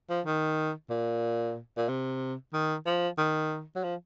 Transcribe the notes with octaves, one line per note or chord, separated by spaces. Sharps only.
F3
D#3
A#2
A#2
C3
D#3
F3
D#3
F#3
F3